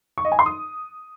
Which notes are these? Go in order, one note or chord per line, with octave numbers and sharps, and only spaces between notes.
C#6
D#5
G#5
C6
D#6